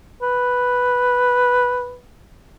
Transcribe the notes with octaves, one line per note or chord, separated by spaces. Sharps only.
B4